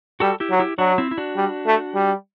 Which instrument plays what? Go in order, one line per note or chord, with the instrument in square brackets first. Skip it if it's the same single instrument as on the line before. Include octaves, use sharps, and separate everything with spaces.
[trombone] G3 [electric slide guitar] F#4 A4
[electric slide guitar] E4 G4
[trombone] F#3
[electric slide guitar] E4 G4
[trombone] F#3 [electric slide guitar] D4 F#4
[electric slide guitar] C4 E4
E4
D4 F#4
[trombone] G3
A3
G3